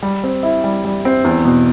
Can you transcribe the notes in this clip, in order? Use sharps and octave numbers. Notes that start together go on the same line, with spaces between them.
G3
C4
E4
G3
G3
C4
E2
B2